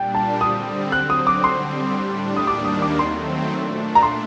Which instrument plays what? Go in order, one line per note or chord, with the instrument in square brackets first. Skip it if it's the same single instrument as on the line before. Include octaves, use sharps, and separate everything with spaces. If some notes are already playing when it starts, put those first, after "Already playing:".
Already playing: [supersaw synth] A#2 G3 D4 [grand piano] G5
[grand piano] A5
[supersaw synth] D3 G3 C4 [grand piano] D#6
[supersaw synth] D3 F#3 C4 [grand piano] F#6
[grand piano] D#6
D6
[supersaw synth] D3 G3 C4 [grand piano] C6
[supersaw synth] A2 G3 D4
[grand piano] D#6
[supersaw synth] D#2 D#3 G3 A#3 D4 [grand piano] D6
[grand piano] D#6
D6
[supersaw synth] D#3 F#3 A3 C4 [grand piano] C6
[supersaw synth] A#2 A3 D4
[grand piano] A#5
C6